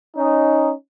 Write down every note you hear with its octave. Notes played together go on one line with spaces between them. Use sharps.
C#4 D#4